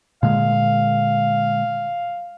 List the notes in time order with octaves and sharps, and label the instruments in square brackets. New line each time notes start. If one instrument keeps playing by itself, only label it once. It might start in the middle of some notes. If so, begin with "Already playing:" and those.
[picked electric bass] A#2 D3 G#3 [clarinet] F5